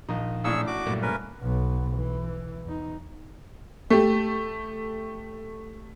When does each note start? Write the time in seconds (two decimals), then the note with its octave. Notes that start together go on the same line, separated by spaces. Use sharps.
0.09 A#1 A#2 D#3 F3 D#4
0.44 A1 A2 D4 G#4 C#6 E6
0.67 F#4 D6
0.87 G2 A#2 F#3 A3 A#3
1.02 C#4 A#4 B4
1.41 B1 B3
1.94 E3
2.64 E2 D#4
3.90 A3 G4